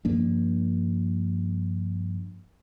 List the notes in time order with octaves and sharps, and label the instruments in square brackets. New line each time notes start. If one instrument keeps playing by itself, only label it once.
[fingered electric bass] G2 F3 A#3 D4